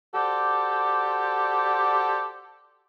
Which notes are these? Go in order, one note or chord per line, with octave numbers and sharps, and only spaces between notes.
F#4 G4 A4 C5 D5